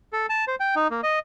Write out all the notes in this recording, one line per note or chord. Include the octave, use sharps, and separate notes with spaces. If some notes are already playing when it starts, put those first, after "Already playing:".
A4
A5
C5
G5
D#4
A#3
D#5